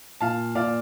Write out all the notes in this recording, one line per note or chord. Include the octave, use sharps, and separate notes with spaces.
A#2 F5 A5
A#2 D5 F5